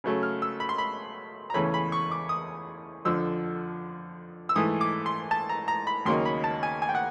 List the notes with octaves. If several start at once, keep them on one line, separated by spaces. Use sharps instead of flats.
C#3 F#3 A3 C#4
F6
E6
B5
C6
B5
A#5
E2 C#3 E3 A3 C#4 B5
B5
C#6
D6
D#6
F2 D3 F3 E6
E6
G#2 E3 A3 D#6
D6
C6
A5
A#5
A#5
B5
D#2 C#3 F#3 A#3 D#4 C6
B5
A5
G#5
G#5
G5
F#5